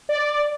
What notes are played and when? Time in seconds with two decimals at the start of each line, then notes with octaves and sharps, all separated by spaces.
0.09 D5